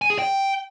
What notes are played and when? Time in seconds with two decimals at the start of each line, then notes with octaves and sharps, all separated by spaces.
0.02 G#5
0.10 G#4
0.19 G5